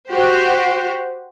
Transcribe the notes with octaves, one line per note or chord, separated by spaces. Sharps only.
F#4 G4 C5